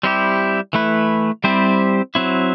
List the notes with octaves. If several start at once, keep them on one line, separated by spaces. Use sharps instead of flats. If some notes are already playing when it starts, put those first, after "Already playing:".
G3 C4 E4 G4
E3 A3 E4 B4
G3 C4 E4 G4 C5
F#3 C4 E4